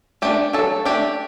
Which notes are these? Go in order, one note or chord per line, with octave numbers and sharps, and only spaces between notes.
A3 D4 G4
F#3 A4
A3 D4 G4